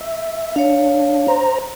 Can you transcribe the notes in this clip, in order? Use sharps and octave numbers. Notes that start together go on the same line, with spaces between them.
E5
D4 C#5 F5
C5 A#5